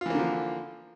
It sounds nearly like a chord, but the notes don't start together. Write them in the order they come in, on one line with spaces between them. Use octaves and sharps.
F4 E3 A#3 D3 F3